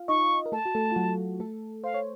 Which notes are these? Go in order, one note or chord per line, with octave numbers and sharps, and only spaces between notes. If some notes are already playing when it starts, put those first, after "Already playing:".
Already playing: F4 F5
D#4 D#5 C#6
A#4
A3 A4 A5
F#4
A3 A4
F4
F#3 F#4
A3 A4
C5 F5
C#5